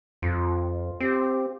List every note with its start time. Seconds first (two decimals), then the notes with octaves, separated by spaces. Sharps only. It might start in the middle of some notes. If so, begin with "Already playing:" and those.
0.22 F2 F4
1.00 C4 G4